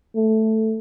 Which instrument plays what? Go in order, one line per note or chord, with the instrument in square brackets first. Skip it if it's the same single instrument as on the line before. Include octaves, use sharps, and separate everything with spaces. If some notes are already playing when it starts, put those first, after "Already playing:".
[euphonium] A3